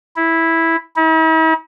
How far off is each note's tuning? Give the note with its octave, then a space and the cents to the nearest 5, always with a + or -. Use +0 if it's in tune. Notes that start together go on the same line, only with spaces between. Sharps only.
E4 -5
E4 -45